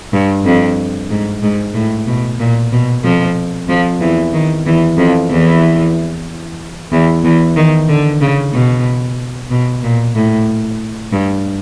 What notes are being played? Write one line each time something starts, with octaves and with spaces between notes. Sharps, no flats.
G2
F2
G#2
G#2
A2
B2
A#2
B2
F2 F3
F2 F3
E2 E3
D#3
E2 E3
F2 F3
E2 E3
E2 E3
E2 E3
D#3
D3
C#3
B2
B2
A#2
A2
G2